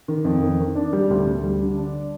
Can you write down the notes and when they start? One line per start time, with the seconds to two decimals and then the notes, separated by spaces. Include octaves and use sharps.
0.08 D#3
0.24 F2
0.42 D#3
0.59 D#3
0.75 D4
0.93 G3
1.10 D2
1.27 D2
1.44 G3
1.60 D3
1.77 D4